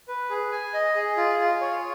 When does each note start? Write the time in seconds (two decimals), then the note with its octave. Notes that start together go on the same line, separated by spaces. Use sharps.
0.08 B4
0.30 G#4
0.52 G#5
0.74 D#5
0.95 G#4
1.17 F4
1.39 F4
1.61 C#5